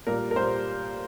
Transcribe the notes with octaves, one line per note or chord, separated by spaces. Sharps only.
A#2 G3 A#4
A#4
A#2 G3 C5